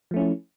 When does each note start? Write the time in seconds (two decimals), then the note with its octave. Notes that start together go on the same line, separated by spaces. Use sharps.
0.11 F3
0.14 A3
0.16 C#4
0.19 E4